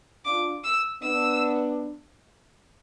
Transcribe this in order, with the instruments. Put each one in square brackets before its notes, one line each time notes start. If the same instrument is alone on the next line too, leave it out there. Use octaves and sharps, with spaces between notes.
[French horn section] D4 F4 [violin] D6
[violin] E6
[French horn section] B3 D4 [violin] E6